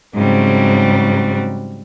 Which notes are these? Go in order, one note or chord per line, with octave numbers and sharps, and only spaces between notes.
G#2 C#3 F#3 G3 C4